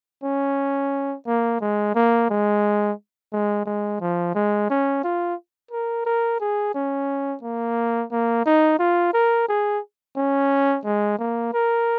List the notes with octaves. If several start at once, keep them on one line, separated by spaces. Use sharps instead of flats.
C#4
A#3
G#3
A#3
G#3
G#3
G#3
F3
G#3
C#4
F4
A#4
A#4
G#4
C#4
A#3
A#3
D#4
F4
A#4
G#4
C#4
G#3
A#3
A#4